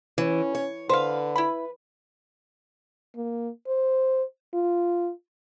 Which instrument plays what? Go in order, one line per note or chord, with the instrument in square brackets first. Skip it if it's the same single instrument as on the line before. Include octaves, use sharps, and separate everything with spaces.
[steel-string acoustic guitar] E3 [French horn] C#4
[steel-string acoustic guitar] C#5
[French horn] D3 [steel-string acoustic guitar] B4 [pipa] C5 F5
[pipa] E4 B5
[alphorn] A#3
C5
F4